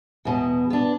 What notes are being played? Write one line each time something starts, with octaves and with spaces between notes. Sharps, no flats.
E2 B2
B3 D4